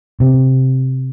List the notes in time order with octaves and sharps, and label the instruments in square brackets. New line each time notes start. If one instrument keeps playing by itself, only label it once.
[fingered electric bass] C3